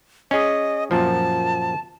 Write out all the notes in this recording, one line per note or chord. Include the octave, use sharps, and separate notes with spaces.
C#4 G#4 D#5
F#2 A#2 F3 A5